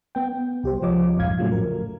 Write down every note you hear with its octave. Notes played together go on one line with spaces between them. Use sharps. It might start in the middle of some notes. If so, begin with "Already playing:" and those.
B3 G5
C2 G4 C5
C#2 F3 C#5 D#5 D6
A#1 F2 G#2 F5 G#6
A2 C#3 F3 F#3 A3
A#4